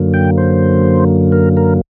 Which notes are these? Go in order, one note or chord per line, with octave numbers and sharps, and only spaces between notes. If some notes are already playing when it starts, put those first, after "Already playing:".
Already playing: F#2 D3 F#3 A#3
G5
C5
A#4
A#4